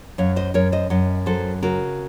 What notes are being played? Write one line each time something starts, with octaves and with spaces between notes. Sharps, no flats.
F#2 C#5 F5
C5 D#5
F#2 A#4 C#5
C5 D#5
F#2 D#5 F#5
F#3 A4 C5
C#3 F#4 A#4